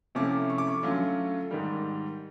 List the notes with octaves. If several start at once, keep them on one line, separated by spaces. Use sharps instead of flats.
C3 F3 A3 C#4 E4 D6
C#6
D6
C#6
D3 F#3 A3 C#4 F4
G#2 D#3 G3